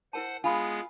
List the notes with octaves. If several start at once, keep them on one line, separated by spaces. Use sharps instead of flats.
E4 A#4 C5 F#5 A5
G#3 B3 F4 G#4 G#5 B5